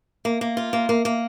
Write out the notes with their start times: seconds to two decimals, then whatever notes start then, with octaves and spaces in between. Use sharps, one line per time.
0.25 A#3
0.41 A#3
0.57 F4
0.73 A#3
0.89 A#3
1.05 A#3